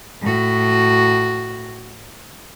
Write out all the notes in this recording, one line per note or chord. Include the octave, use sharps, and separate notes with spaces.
A2 F#4